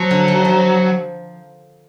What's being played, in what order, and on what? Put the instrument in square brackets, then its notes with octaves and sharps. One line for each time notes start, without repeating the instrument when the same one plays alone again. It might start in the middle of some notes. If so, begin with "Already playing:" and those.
Already playing: [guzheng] F3 [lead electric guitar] F#3
[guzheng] D3
D#3
F3